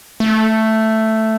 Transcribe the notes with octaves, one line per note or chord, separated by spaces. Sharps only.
A3